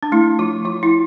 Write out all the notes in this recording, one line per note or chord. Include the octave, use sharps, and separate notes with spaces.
D4
A3 E4
F3 F4
F3 F4
E4